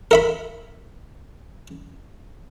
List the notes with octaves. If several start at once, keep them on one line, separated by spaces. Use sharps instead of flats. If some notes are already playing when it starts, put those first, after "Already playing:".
A#4 E5 B5